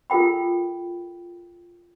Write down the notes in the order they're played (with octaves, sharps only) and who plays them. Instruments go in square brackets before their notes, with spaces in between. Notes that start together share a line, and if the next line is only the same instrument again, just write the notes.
[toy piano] F4 A4 A#4 G5 B5